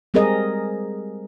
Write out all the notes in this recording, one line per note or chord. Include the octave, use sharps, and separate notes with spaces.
G3 G#3 C4 G#4 A#4 D#5